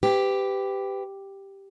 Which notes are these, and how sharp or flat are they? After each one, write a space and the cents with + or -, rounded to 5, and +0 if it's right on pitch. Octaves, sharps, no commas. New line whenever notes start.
G4 +0 B4 +30